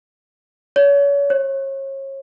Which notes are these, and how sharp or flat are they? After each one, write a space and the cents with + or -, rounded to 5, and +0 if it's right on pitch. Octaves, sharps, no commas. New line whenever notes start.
C#5 +35
C#5 -35